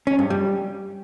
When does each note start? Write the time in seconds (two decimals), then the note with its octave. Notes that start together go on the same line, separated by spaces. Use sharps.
0.07 C#4
0.19 G2
0.30 G3